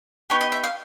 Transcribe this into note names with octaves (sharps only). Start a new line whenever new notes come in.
B3 D#4 G4 C#5
D#5
E5
F5